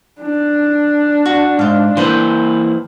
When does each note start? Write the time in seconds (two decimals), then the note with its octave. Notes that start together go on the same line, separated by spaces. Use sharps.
0.21 D4
1.26 F#4
1.59 G#2 F4 F5
1.97 E3 A#3 B4 C5 G5